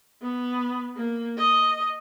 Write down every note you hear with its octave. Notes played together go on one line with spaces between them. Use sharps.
B3
A#3
D#5